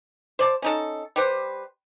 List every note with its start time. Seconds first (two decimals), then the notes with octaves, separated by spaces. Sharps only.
0.39 C5 D5 A5
0.62 C#4 D#4 A4
1.16 G3 G4 B4 C5